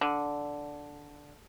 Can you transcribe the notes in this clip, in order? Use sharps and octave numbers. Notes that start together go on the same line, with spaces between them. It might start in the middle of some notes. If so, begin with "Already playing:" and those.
D3